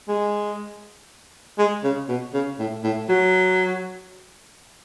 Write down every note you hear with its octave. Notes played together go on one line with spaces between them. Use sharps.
G#3
G#3
C#3
B2
C#3
A2
A2
F#3